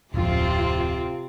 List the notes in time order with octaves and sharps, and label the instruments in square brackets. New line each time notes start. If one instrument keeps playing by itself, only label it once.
[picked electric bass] D1 F2 [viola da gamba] C3 C4 [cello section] F4